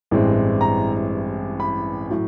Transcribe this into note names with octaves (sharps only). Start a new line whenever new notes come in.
A1 G2 E3 G#3 C4
A#5
B5
A2 F#3